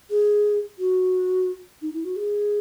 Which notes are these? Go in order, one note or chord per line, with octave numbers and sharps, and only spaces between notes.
G#4
F#4
D#4
E4
F#4
G#4